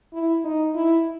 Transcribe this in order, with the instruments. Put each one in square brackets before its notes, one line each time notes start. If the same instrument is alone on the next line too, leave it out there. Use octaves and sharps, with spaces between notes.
[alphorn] E4
D#4
E4